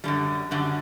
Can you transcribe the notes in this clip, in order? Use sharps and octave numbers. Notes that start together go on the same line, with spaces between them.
F#2 D3 G3
F#2 D3 G3